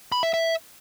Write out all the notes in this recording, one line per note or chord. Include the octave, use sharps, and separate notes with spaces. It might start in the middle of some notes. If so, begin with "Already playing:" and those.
B5
E5
E5